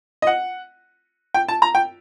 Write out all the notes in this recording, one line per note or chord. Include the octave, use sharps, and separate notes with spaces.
D#5
F#5
G5
A5
A#5
G5